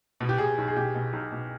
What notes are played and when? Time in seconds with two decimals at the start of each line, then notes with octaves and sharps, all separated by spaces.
0.20 B2
0.29 G4
0.38 B2 G#4
0.58 B1
0.68 G#4
0.76 B2 G4
0.95 B2
1.13 B1
1.32 B2